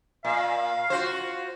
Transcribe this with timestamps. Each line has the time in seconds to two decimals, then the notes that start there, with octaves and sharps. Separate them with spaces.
0.25 A#2 F5
0.90 F4 F#4 C5